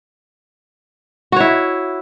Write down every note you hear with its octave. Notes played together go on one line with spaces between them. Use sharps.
E4 F#4 C#5